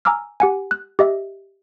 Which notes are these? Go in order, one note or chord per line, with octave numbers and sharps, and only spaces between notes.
G#5 A#5 D6 E6 F6
G4 F#5 G#5
F#6
G4 D#5 E5